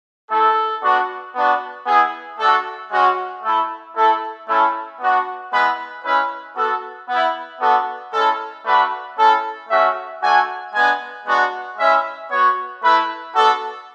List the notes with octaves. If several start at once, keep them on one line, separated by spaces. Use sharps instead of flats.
A3 E4 A4
B3 D4 F#4
B3 D4 F#4
B3 E4 G#4
A3 D4 F#4 A4
G#3 C#4 F#4
A3 E4 A4
A3 E4 A4
A3 C#4 E4 A4
B3 D4 F#4
G#3 B3 E4 B4
G#3 C#4 E4 B4
B3 F#4 A4
B3 E4
B3 D4 F#4 A4
G#3 C#4 E4 A4
A3 D4 F#4 B4
A3 C#4 E4 A4
A3 C#4 F#4 E5
A3 D4 F#4 G#5
G#3 B3 D4 G#5
G#3 B3 D4 F#4 F#5
G#3 C#4 E4 E5
B3 F#4 C#5
A3 E4 B4
B3 D4 F#4 A4